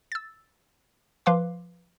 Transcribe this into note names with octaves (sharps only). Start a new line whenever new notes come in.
E6 A6
F3 B4 F5 C6 D6